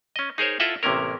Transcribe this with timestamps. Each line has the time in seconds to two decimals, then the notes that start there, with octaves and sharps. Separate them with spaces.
0.16 C#4 D#5
0.38 D#4 G#4 A#4 C5 C#5
0.60 E4 F4 A4 D#5 E5 F#5
0.83 A1 C3 A#3 C#4 A#4